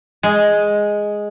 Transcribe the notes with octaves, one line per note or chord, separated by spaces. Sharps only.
G#3